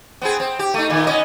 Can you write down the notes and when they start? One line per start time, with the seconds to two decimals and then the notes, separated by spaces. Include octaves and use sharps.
0.22 B3 C4 G#4
0.40 C4
0.59 G4
0.74 A3 D#4
0.90 A#2 D#3
1.07 B3 C#4 D#5